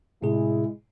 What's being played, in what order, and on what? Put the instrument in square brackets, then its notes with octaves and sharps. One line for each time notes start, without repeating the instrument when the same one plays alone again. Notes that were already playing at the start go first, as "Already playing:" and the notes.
[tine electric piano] A2 C3 G#4 [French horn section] G#3 E4